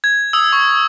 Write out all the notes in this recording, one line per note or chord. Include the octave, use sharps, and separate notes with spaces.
G#6
D#6 E6
C#6